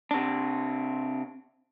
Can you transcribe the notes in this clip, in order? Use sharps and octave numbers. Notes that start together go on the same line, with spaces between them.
C3 D4